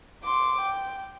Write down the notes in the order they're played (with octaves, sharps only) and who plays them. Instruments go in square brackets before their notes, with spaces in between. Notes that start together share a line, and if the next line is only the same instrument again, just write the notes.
[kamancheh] C6 D6
G5